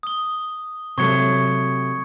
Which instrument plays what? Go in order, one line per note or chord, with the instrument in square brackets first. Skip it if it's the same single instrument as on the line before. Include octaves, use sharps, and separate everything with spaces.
[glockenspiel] D#6 G7
[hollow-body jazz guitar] C3 F#3 A3 [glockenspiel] C#6 G#6 C#7